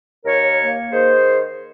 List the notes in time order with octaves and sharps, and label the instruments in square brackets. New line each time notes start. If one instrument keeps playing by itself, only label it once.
[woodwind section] D#2 A#4 C#5
A#3
D#3 G#4 C5